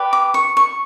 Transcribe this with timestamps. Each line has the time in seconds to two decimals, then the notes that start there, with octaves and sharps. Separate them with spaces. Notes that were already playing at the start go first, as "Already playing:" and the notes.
Already playing: G4 B4 D5
0.13 D6
0.34 C#6
0.57 C#6